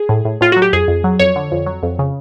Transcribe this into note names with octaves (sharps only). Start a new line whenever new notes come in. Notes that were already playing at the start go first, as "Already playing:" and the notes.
Already playing: G#4
A2
A2
A2 F4
F#3 F#4
G4
F2 G#4
F2
F#3
F2 C#5
D3
F2
F#3
F2
C#3